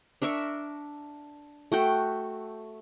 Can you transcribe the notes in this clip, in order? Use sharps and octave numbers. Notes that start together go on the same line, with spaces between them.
D4 A#4 E5 C#6
A3 F#4 G5